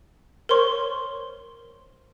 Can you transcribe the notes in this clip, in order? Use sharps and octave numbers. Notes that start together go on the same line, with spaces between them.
A#4 C5 C#5 C6 C#6